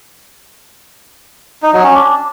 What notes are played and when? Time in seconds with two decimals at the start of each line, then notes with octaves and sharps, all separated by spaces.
1.63 D#4
1.73 F#3
1.84 C#4
1.94 D4